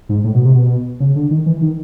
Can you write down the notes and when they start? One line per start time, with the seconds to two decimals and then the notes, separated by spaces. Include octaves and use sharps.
0.09 G#2
0.24 A2
0.35 B2
0.45 C3
0.55 B2
1.00 C#3
1.16 D3
1.31 D#3
1.46 E3
1.61 D#3